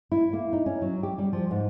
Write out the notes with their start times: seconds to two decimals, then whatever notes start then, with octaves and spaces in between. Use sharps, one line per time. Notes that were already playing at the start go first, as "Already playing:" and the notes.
0.12 E4
0.33 A#3
0.53 D#4
0.66 C#4
0.82 F#3
1.03 G4
1.18 G3
1.33 F3
1.51 G#2